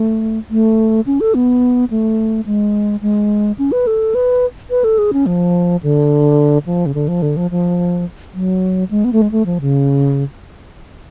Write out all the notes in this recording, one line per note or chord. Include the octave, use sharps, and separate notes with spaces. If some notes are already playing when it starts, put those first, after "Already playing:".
Already playing: A3
A3
C#4
A4
B3
A3
G#3
G#3
C#4
B4
A4
B4
B4
A4
G#4
C#4
F3
D3
F3
C#3
D3
F3
D3
F3
F3
F#3
G#3
B3
A3
G#3
A3
F3
C#3